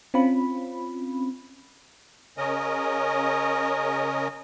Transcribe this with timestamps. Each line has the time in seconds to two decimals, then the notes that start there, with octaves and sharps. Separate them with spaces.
0.14 C4 C#4 F4 B5
2.38 C#3 C#4 A#4 D#5